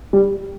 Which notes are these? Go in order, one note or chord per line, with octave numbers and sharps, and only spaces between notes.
G3